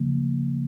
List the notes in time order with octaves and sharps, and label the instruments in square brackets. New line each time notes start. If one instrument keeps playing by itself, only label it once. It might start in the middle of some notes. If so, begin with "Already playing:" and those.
Already playing: [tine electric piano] C#3 F3 A#3